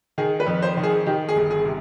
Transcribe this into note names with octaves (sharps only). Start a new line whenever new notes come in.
D#3 G#4
B4
F2
C5
D#3
G#4
D#3 G4
G#4
G1
G#4
C3